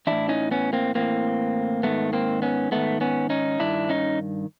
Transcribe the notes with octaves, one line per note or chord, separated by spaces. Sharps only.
A2 E3 D4 E4
C#4 D#4
B3 C#4
A#3 C4
A2 E3 A#3 C4
G#2 D#3 A3 B3
A#3 C4
B3 C#4
G#2 D#3 A3 B3
B3 C#4
C#4 D#4
G2 D#3 D4 E4
C#4 D#4